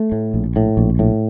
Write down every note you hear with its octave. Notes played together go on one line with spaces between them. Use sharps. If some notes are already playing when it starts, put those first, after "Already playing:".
Already playing: A3
A2
A#1
A2
A#1
A2